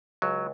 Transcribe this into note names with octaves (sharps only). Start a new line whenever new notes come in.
C#2 F#3